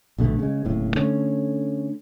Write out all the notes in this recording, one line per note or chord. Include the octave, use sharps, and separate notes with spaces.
A#1 B2 D3 A3
C#3 G#3
D1 D#2 A2 C#3
D3 A3 C#4